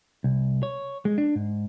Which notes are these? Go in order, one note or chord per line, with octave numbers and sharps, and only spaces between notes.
C2
C#5
G#3
D4
G#2